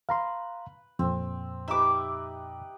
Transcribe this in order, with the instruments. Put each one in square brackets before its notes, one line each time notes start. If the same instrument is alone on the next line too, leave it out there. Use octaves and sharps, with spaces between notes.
[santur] B4 [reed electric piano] F5 A#5 C6
[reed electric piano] F2 A#2 [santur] C4
[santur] D#4 G4 B4 [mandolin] E5 D6